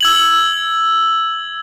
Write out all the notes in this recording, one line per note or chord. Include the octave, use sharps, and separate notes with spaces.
E6 G#6 F#7